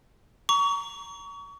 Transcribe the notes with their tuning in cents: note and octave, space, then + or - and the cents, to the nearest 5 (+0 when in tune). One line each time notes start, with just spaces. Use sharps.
A#5 +0 C#6 +30